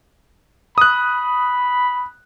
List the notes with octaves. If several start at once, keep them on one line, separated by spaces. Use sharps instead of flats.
B5 D#6 F#6